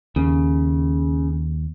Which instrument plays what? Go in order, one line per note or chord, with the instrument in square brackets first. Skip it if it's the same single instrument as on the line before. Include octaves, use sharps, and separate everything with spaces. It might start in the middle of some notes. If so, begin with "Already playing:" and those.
[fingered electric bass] D#2 [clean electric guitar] C#3